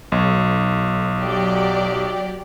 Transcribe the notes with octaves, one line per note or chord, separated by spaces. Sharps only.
B1
F#3 G4 D5